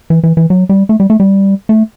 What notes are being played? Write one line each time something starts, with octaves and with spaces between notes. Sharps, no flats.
E3
E3
E3
F#3
G3
A3
G3
A3
G3
A3